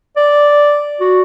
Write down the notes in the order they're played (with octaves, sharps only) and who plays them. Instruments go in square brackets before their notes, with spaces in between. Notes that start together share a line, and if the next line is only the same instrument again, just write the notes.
[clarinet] D5
F#4